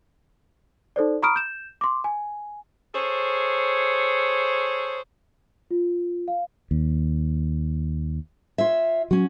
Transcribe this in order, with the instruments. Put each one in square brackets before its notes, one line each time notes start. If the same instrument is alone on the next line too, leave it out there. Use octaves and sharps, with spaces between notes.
[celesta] D#4 A4 C5 D5
A#5 B5 C#6 D#6 F6 D7
G6 E7
C6 D6
G#5
[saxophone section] G#4 A4 C5 C#5
[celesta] F4
F5
[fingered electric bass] D#2
[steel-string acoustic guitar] F4 C#5 E5
[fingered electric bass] F#3 [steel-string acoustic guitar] C#4 F#4